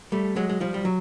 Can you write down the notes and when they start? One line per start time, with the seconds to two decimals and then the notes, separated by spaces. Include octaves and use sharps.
0.12 G3 A3
0.36 F#3 G#3
0.49 G#3
0.60 F3 G3
0.74 G3
0.85 F#3